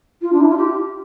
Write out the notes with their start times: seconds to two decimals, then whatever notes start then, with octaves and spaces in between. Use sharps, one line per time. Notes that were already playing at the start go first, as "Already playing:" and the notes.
0.21 F4
0.32 D4
0.40 E4
0.49 F4
0.57 G4